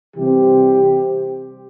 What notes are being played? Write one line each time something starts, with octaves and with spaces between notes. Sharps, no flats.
C3 E3 G3 C4 G4